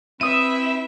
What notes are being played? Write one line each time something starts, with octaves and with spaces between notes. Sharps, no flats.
C4 E4 B4 E5 D#6 D#7